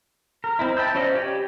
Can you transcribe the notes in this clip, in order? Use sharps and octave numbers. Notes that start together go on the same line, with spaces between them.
A#4
C4 D#4 E4
G5 A5 B5 E6 G6
C#4 F4 C5 D5 D#5
G4 G5 G#5